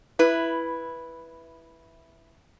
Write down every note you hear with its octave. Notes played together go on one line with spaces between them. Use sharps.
E4 B4